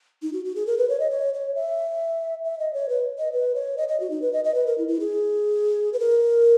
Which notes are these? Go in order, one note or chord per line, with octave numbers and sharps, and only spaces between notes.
D#4
F#4
F#4
G#4
A#4
B4
C#5
D#5
C#5
C#5
E5
E5
D#5
C#5
B4
D#5
B4
C#5
D#5
D#5
F#4
D#4
B4
D#5
D#5
B4
A#4
E4
E4
G#4
B4
A#4